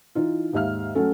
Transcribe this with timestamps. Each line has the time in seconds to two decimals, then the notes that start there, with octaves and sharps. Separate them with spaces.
0.15 E3 D#4 F4
0.52 D#2 G#2 G4 E5 F5 F6
0.95 F#3 A3 C#4 A4